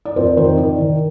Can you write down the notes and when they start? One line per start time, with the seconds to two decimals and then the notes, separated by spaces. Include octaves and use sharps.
0.05 D5
0.16 F2 C5
0.37 D#3 C5
0.57 D#3 D5
0.78 D#3